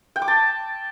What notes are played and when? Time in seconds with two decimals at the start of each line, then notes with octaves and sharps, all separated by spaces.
0.16 G5
0.22 D6
0.28 A5